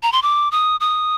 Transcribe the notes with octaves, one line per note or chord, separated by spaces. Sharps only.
A#5
C6
D6
D#6
D#6